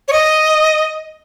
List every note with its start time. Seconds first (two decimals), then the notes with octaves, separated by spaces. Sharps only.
0.08 C#5
0.13 D#5